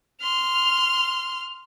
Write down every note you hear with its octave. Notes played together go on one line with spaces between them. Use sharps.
C6 F6